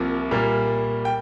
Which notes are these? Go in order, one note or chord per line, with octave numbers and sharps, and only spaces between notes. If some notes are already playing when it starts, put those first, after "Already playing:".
Already playing: C2 C3 F3 A#3
A#2 G3 A#3
G5